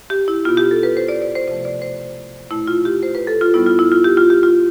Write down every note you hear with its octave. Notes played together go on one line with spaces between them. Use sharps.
G4
E4
B2 B3 F4
G4
A4
B4
C5
D5
D5
C5
C3 F3 A3 C5
D5
C5
B2 A3 E4
F4
G4
C5
B4
A4
F4
A2 G3 B3 E4
F4
E4
F4
G4
F4
G4
F4